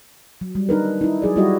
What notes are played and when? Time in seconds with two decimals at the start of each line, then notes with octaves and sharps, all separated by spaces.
0.41 F#3
0.55 G3
0.69 D4 D#4 A#4 B4
1.01 D#4 E4
1.22 F#3 G#4 D5
1.36 F#3 G3 E4 F#4 G4 D#5